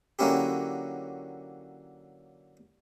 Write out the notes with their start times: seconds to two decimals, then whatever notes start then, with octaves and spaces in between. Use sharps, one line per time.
0.19 D3 F#3 A#3 C#4 E4 G4